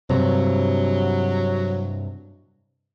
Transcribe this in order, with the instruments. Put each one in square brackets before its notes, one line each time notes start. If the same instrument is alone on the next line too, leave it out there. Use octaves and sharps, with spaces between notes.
[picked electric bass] G2 C3 [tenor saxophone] F#3